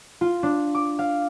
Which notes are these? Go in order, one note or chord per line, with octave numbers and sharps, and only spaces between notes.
F4
D4
D6
F5